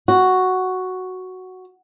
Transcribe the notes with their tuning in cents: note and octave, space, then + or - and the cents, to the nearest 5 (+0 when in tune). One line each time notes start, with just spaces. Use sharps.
F#4 +0